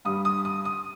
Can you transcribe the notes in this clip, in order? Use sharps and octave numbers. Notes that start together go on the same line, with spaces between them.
G2 G3 D#6
D#6
D#6
D#6